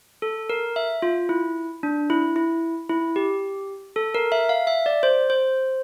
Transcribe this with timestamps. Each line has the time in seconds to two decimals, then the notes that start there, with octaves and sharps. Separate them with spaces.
0.22 A4
0.50 A#4
0.76 E5
1.02 F4
1.29 E4
1.83 D4
2.10 E4
2.36 E4
2.89 E4
3.16 G4
3.96 A4
4.15 A#4
4.32 E5
4.49 F5
4.67 E5
4.86 D5
5.03 C5
5.30 C5